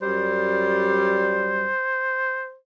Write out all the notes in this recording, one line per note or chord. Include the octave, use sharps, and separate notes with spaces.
F#2 G3 C5